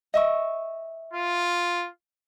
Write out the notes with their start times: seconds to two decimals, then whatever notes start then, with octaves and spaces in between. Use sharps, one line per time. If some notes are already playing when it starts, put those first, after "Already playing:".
0.14 D#5 E5 C#6
1.13 F4